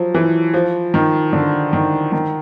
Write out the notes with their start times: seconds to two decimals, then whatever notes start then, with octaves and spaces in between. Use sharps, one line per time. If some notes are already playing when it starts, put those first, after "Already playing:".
Already playing: F3 F#3
0.14 E3
0.54 F3
0.94 D#3
1.33 D3
1.73 D#3
2.12 D#3